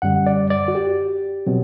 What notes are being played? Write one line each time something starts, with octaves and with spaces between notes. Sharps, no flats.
F#2 D3 G3 F#5
D5
D5
F#4
G4
B2 F#3 C4